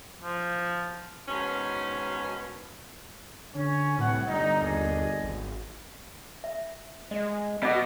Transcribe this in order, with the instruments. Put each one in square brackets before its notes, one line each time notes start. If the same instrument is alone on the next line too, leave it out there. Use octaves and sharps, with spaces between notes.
[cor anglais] F3
[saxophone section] G#2 B2 D#3 C#4
[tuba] D3 [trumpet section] C#4
[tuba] C2 [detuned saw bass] A2 [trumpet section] B3 C#5 F#5
[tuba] G1 [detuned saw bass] G3 [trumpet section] D#4
[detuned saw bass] D#2 [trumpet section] D4 G#4 D#5
[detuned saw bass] G#1
[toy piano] E5
[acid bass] G#3 [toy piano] D#5
[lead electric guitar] B2 [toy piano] D#5 B5 D6